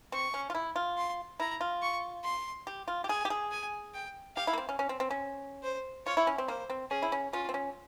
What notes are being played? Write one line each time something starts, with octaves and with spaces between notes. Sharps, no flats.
C4 C#6
C#4
F4
E4
F4
C6
E4 A#5
F4
C#6
C6
G4
F4
G4
G#4 G#5
G4
G#4
G#5
G5
G4 F5
E4
A#3
C4
C#4
C#4
C4
C4
C#4
C5
F4 C#5
E4
C#4
C4
A#3 C5
C4
C#4 G#4
E4
C#4
C#4 F4
C4
C#4